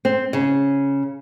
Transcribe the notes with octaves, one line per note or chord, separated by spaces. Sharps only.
C4
C#3